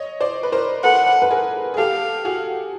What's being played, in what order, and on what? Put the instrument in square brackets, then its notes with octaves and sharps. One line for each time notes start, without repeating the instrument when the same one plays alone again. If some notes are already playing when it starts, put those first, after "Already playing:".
Already playing: [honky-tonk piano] C#5 D#5
C5 D5
B4
A#4 C5
[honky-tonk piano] A4 B4 [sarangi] F#5
[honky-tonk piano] B4
G#4 A#4
G#4
[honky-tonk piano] G4 A4 [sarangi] F5
[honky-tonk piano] F#4 G#4